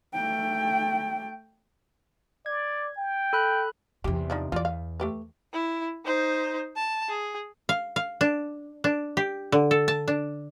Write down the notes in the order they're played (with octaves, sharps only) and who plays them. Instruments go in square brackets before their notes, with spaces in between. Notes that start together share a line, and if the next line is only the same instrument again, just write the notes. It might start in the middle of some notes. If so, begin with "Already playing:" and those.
[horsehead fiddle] A3 G5
[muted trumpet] D5 [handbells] G#6
[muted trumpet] G5
[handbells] A4 B5 F#6
[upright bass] E2 C3 [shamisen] G4
[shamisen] F3 D4 D#4
[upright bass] E2 [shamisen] F4 D5
[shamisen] F5
A3 G4 B4
[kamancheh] E4
D#4 C5
A5
G#4
[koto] F5
F5
D4
D4
G4
D3
A4
A5
D4